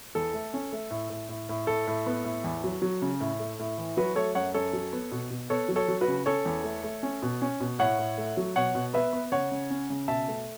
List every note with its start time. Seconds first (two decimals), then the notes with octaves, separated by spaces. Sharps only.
0.15 E2 A4
0.34 A3
0.54 C#4
0.72 A3
0.91 A2
1.10 A2
1.29 A2
1.49 A2
1.67 A2 A4
1.87 A2
2.06 B3
2.24 A2
2.44 E2
2.64 F#3
2.82 F#3
3.02 C#3
3.20 A2
3.39 A3
3.59 A2
3.78 E3
3.97 F#3 F#4 B4
4.16 A3 A4 C#5
4.35 F#2 C#5 F#5
4.54 F#2 A4 C#5
4.73 F#3
4.93 B3
5.12 B2
5.30 B2
5.50 B3 A4 C#5
5.68 F#3
5.76 A4 C#5
5.88 F#3
6.01 F#4 B4
6.08 C#3
6.26 C#4 A4 C#5
6.45 E2
6.64 A3
6.84 A3
7.03 C#4
7.23 B2
7.42 C#4
7.60 B2
7.79 A2 C#5 F#5
7.99 A2
8.18 A3
8.37 F#3
8.56 B2 C#5 F#5
8.75 B2
8.93 B3 B4 E5
9.13 B3
9.32 C#3 C#5 F#5
9.51 C#3
9.70 C#4
9.90 C#3
10.08 B2 E5 A5
10.28 A3